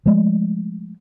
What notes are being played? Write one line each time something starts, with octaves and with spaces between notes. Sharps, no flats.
F3 G#3 A3